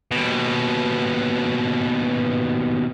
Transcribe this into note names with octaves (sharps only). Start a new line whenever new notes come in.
D#2 B2